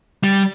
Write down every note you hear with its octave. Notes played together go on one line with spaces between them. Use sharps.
G3